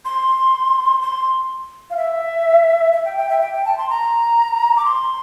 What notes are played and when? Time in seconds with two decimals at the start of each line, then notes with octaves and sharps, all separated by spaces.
0.05 C6
1.01 C6
1.90 F5
1.97 E5
2.93 E5
3.05 G5
3.17 G5
3.29 E5
3.41 G5
3.55 G5
3.65 A5
3.78 C6
3.89 A#5
4.76 D6
4.85 C6